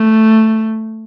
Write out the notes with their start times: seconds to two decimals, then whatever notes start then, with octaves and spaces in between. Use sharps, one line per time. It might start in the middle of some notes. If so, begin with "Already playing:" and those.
Already playing: A3